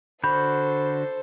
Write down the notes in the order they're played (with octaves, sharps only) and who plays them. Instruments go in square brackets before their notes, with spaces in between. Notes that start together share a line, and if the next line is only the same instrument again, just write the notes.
[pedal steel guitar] D3 F#4 G6 [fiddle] A4 C5 [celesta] B5